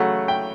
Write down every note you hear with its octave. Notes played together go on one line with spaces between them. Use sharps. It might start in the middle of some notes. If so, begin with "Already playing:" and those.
Already playing: C#3 F#3 A3 F#5
G5